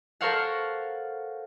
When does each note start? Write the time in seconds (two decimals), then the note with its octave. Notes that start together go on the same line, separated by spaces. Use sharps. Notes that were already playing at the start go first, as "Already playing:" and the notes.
0.21 A4 A#4 C5 C#5 F5 F#5